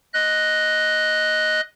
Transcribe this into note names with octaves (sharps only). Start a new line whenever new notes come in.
D#5 F#6